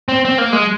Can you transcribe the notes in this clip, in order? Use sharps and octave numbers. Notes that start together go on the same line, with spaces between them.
C4
C4
A#3
G#3